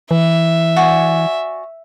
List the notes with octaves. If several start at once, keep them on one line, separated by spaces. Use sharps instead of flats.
E3 E5
F#4 D5 G#5